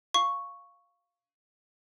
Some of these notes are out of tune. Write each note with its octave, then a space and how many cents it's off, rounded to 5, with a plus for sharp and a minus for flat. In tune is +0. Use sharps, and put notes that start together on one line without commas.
F5 +0 C#6 +0